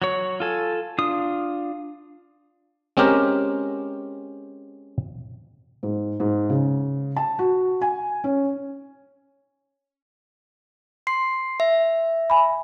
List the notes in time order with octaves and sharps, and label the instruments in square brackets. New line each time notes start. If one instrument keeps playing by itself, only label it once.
[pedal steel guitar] F#3 C#5
F4 A4 G#5
D4 F4 D#6
[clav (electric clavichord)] G#3 C4 C#4 G4 A#4
[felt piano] G#2
G#2
C#3
A5
F#4
G#5
C#4
[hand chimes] C6 C7
E5
[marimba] G#5 B5